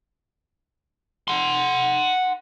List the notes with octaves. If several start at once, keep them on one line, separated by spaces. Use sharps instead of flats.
F#5 C6